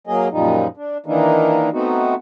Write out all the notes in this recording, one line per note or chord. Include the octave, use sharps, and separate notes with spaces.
F#3 A#3 G#4 D#5
F#2 A#2 F3 G3 D#4
D4
D#3 E3 A#3 D4 D#4
A3 B3 C4 D#4 F#4